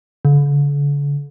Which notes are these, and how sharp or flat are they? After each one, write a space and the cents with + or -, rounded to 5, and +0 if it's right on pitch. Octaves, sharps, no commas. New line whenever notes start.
D3 -45